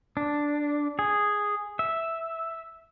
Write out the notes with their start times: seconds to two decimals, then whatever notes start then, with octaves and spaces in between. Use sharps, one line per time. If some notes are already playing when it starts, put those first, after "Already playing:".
0.17 D4
0.99 G#4
1.79 E5